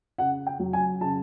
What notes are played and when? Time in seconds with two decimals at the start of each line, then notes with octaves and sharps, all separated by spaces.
0.18 C#3 F#5
0.46 G5
0.59 F#3
0.73 G#5
1.01 C#3 A5